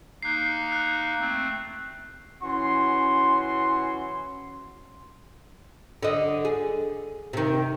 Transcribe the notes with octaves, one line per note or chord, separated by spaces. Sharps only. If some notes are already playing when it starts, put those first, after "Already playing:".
A#3 D#4 F#6 C7
F#6
A3 C4
E3 C#4 F#4 C6
D3 D#5
G#4
C3 D#3